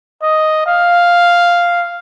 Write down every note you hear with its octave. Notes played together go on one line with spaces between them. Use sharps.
D#5
F5